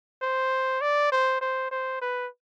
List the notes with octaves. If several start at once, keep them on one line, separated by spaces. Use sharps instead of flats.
C5
D5
C5
C5
C5
B4